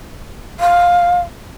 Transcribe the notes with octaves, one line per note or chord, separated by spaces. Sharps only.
F5